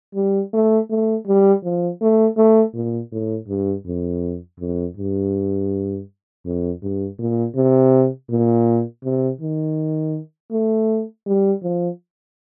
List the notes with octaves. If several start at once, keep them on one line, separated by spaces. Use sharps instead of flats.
G3
A3
A3
G3
F3
A3
A3
A#2
A2
G2
F2
F2
G2
F2
G2
A#2
C3
A#2
C3
D#3
A3
G3
F3